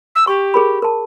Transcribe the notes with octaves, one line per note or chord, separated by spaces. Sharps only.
E6
G4 C#6
G#4 A#4 B5
A#4 A5